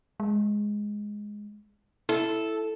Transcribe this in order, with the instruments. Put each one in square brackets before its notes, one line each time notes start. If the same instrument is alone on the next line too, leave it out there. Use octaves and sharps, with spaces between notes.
[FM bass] G#3
[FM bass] E4 [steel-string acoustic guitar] A4